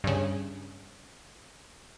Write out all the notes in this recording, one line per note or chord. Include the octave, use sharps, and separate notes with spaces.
G2 C#3